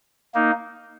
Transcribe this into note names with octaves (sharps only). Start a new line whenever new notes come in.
A#3 D#4